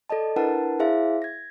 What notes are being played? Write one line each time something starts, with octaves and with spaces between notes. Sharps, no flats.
A4 D5 D#5 A5
D4 E4 A#4 B4 F#5 A5
E4 G#4 C5 E5 F5
G#6 A#6